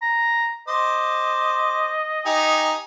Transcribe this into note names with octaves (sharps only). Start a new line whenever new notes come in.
A#5
C5 D#5 D6
D#4 G4 G#5